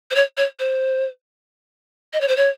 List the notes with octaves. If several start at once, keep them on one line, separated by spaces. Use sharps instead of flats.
C5
C#5
C#5
C5
D#5
C#5
C5
C#5